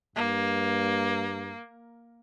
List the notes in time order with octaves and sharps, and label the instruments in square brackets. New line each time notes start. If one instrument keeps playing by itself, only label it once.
[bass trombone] G2 [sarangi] A#3